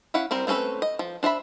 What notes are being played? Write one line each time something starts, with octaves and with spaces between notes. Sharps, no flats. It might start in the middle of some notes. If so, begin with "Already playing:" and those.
C#4 E4 F5 F#5
G3 C4 A#4 C5
A3 C4 C#4 A4 B4
D#5
F3
D4 C5 E5 B5